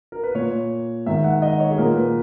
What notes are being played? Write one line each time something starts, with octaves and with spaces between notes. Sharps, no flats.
A#4
B4
A#2 C#5
G#2 D#3 E5
F#5
D#5
C#5
G#4
A#2 A#4
B4